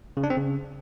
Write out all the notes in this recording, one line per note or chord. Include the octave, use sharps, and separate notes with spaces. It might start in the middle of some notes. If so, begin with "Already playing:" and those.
C#3
D4
C4
C#3